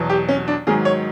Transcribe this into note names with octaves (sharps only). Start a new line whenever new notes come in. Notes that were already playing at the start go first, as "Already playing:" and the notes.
Already playing: E2 B2 F#3
G4
C#4
D4
G#2 D#3 F#3 G#4
C#5